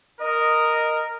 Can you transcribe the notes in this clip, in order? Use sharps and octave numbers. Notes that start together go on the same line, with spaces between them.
A#4 D#5